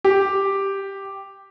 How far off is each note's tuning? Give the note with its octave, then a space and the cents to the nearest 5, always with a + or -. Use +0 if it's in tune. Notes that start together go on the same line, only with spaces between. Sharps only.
G4 +0